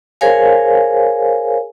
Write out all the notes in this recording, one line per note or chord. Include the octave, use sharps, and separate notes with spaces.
G#4 A#4 C5 C#5 F5 G#5